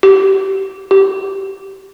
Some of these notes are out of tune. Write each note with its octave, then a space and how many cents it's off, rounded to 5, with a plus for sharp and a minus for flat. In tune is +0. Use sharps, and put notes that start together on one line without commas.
G4 -20
G4 -15